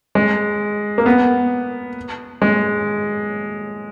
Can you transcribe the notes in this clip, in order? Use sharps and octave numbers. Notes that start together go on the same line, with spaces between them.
G#3
A#3
B3
G#3